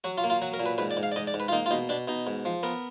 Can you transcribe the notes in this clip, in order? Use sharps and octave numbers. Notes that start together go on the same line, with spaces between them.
F#3 F#4
F4
A#3
F4
F#3 F#4
A#4
A#2
B4
G#2 B4
D5
G#2
F5
D5
G#2 D#5
D5
G#2
B4
F4
A#3 D#4
F4
B2 D#4
B2 D4
B2 D#4
G#2
F3
B3 A#4